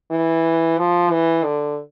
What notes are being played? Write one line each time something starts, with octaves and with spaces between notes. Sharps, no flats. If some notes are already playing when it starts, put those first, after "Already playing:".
E3
F3
E3
D3